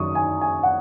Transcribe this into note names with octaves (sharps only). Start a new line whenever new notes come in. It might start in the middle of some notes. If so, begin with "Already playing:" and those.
Already playing: F#2 D#3 F#3 C#4 C#6 D#6
G#5
G#5
F#5